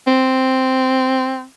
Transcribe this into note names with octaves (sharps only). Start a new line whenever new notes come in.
C4